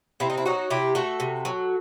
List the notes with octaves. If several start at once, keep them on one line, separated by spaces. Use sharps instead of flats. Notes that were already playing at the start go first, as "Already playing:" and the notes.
C3 C4 E4
D#4
E4
F#3 D#4 F#4
C3 E4 G4
A3 F#4 A4
C3
F#3